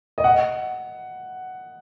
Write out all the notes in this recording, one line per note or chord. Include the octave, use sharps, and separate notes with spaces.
D#5
F#5